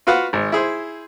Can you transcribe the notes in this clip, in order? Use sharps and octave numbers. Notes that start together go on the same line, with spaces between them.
F4 F#4 B4 F5 F#5
G#1
E4 G#4 C5